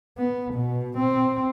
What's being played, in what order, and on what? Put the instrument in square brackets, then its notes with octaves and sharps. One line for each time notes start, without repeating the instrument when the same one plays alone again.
[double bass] B3
B2
C4